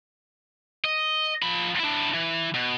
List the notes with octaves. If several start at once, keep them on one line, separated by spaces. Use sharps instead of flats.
D#5
F3 B5
D4 E4
E3
B2